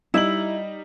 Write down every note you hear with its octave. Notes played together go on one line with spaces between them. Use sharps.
G3 D#4 E4 F#7